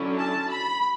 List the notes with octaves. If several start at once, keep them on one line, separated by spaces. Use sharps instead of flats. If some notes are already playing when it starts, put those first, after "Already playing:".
Already playing: D3 F#3 C#4 E4
A5
B5